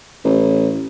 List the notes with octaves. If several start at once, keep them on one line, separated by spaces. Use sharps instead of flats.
A1